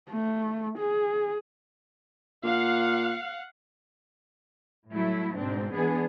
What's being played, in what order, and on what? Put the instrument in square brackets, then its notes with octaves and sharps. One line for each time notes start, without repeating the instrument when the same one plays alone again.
[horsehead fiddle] A3
G#4
[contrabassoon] A#2 [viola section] F5 F#5
[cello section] A2 F#3 G3 A3 E4
G#2 B2 C4 D4
E3 G#3 B3 D4 G#4